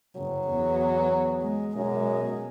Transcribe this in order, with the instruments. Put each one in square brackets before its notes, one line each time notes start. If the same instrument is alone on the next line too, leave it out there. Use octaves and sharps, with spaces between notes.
[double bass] F#1 [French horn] F#3
[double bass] E2 B3
G#3
[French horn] F#2 [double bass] B2 G#3